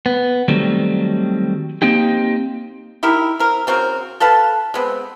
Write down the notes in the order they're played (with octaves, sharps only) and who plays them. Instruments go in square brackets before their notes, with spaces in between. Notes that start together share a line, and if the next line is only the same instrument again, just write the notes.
[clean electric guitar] B3
D#3 F#3 G3 A3 C4
A#3 C4 D#4 G4
[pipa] D#4 E4 G4 A#4
C4 A#4
C#3 C4 F#4 A#4
A4 B4 F5 A5
G#3 B3 C4